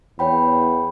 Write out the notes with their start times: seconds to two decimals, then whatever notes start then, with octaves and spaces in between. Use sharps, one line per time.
0.19 E2 C#5 G5 B5